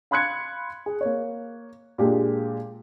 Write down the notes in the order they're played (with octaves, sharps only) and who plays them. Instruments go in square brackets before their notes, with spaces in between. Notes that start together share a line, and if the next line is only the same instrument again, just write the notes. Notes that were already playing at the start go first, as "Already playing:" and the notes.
[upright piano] F5 B5 C6 F#6 G#6 C#7
G#4
A#3 C#5
A#2 G#3 D4 G4